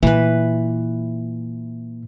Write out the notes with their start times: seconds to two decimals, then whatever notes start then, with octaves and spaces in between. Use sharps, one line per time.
0.03 A#2 E3 B4